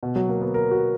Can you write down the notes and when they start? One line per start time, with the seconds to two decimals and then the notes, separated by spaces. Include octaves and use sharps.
0.03 B2
0.16 F#3
0.29 A#3
0.41 B3
0.54 A#4
0.71 F#4